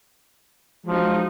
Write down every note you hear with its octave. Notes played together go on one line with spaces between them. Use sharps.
F3 F#3 G#3 D#4